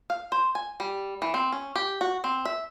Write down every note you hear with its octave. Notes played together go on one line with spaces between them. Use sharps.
F5
C5
G#5
G3
E3
C4
C#4
G4
F#4
C4
E5